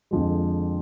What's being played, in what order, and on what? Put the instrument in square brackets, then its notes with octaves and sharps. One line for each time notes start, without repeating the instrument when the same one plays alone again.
[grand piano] F2 D3 F3 G#3